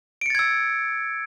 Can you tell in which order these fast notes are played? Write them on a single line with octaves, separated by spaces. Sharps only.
D7 C#7 A6 G#6 E6